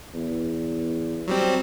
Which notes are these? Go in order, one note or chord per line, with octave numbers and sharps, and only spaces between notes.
E2
F#3 G3 C4